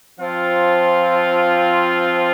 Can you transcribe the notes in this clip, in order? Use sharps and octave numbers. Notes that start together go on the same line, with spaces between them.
F3 C4 F4